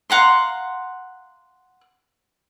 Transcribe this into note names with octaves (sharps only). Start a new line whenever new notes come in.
F5 F#5 A#5 C6